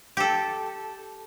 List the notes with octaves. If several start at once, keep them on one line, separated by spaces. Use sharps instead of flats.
G4 A4